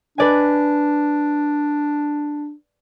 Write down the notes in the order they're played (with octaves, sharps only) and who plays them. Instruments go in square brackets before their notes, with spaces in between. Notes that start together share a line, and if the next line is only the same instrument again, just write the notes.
[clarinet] D4 [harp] B4 D5 G#5